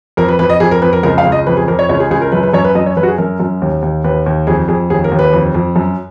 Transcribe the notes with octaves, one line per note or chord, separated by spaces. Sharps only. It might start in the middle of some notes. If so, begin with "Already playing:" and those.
F2 A#4
B4
F2 B4
D#5
F2 G#4
A#4
F2 B4
A#4
C#2 A#4
F5
C#2
D#5
F2 B4
G#4
F2 A#4
C#5
C#2 C#5
G#4
C#2 G#4
A#4
F#2 B4
B4
F#2 C#5
B4
F#2 D#5
C#5
F#2 B4
F#4
G#4
F#2 A#4
F#2
D#2
D#2
D#2 B4
D#2
F2 G#4
F2 G#4
D#2 G#4
A#4
D#2
B4
F2
F2
F#2